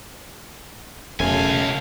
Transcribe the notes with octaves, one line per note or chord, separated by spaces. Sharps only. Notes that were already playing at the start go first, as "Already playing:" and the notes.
E1 C#2 F#2 A3 F5 G#5 A5